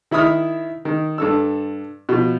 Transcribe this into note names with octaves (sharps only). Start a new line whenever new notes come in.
D#3 E4 B5 D#6 F6
D#3
G2 A4 E6
B2 F3